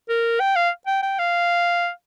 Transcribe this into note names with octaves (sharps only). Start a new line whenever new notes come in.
A#4
G5
F5
G5
G5
F5